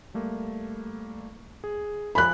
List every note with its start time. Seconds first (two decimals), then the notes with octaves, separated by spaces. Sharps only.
0.14 G3 A3 A#3
1.64 G#4
2.15 F3 G#5 B5 F#6